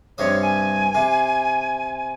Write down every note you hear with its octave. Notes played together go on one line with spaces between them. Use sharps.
G2 C3 C#5 D#6
G#5
C3